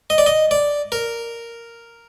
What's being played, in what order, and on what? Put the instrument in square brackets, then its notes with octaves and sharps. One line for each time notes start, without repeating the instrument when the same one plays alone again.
[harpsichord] D#5
D5
D#5
D5
A#4